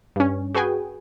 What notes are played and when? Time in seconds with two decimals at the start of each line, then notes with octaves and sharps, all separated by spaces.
0.16 G2 C#4
0.55 F#4 G#4 B4 G5 G#5